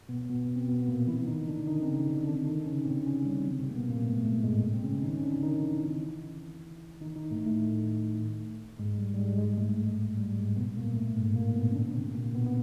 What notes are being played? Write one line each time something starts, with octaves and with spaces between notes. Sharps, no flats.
B2 B3
B2 B3
C4
B2 B3
B3
A#2 A#3
E3 E4
D#3 D#4
D3 D4
D#3 D#4
C4
C#3 C#4
D3 D4
D3 D4
D#3 D#4
C#3 C#4
C3 C4
C#3 C#4
G3
F#3
C3 C4
A#3
B2 B3
A#2 A#3
A2 A3
G#3
A2 A3
G#2 G#3
C4
C#3 C#4
D#3 D#4
C#4
D3 D4
D#3 D#4
E3 E4
D#3 D#4
D#3 D#4
A2 A3
A2 A3
G#2 G#3
G3
G3
G#2 G#3
G#2 G#3
A2 A3
G3
G#2 G#3
B2 B3
A#2 A#3
A2 A3
G#2 G#3
A#2 A#3
B2 B3
C#4
D3 D4
C3 C4
A#2 A#3
B2 B3
B3